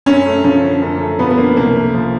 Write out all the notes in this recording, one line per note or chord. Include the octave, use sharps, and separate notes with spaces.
F#2 C#4
A3
F3 C#4
D3
F#2
A3
F3 B3
B3
D3 A#3
C2 A#3
A3
F3